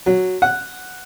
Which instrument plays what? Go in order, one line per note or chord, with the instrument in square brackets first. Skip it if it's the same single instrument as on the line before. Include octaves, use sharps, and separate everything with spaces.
[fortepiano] F#3
F#5